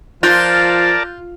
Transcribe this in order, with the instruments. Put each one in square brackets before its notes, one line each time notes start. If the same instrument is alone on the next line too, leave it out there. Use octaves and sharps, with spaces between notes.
[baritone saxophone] F3 [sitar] F4 [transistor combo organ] A#4 D5 A5 [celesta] F#6 G6 A6